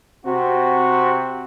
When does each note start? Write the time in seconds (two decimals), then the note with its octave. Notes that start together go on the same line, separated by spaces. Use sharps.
0.24 C3 C4 F#4